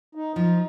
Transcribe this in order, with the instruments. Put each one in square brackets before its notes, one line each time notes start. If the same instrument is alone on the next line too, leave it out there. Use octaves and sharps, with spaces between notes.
[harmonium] D#4
[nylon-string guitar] F3 [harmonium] D#4